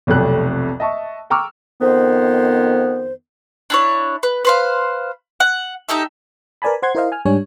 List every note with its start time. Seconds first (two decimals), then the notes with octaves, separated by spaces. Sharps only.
0.07 F1 B1 F2 C3 A3 F#6
0.80 D#5 E5 A5 C#6
1.30 G5 A#5 C#6 D6 E6 F6
1.80 F2 D#3 B3 C5
3.70 D4 E4 C#5
4.23 B4
4.45 B4 C5 F5
5.40 F#5
5.88 D#4 G4 A4 E5
6.62 A#4 B4 D5 G#5 A5 B5
6.82 C5 F#5 C6 G#6
6.95 E4 A#4 C5 D#5 F5
7.12 G#5 F6
7.25 G#2 G3 D4 C#5 G#5